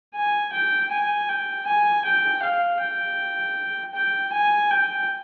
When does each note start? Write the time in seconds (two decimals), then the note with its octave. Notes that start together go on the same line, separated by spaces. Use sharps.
0.14 G#5
0.52 G5
0.91 G#5
1.29 G5
1.67 G#5
2.05 G5
2.43 F5
2.81 G5
3.95 G5
4.33 G#5
4.71 G5